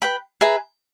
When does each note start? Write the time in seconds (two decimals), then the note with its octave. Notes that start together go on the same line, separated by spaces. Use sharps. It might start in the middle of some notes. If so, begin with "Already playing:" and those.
0.02 B4 G5 B5
0.41 G#4 B4 E5 A#5